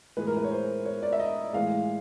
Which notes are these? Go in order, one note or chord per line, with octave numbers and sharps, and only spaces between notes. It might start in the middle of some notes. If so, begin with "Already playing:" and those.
A2 E3 G#3 B4
A#4
B4
C#5
C5
C#5
D5
E5
D#5
A2 E3 G#3 F5